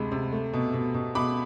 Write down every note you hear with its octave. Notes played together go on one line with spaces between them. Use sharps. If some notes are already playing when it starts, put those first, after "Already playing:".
Already playing: D2 C3 G#3 B5
C3
A3
B2
B2
B2
B2 B5 D6